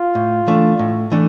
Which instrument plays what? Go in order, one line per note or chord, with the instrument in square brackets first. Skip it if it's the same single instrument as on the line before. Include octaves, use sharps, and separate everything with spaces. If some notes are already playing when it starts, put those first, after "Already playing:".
Already playing: [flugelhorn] F4
[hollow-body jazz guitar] A2
E3 A3 D4
A2
E3 A3 D4